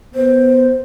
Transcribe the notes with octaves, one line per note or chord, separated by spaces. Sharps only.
B3 C5